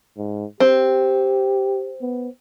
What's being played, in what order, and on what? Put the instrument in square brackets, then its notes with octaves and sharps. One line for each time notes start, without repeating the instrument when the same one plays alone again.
[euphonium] G#2
[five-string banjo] C4 [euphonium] G4
[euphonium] B3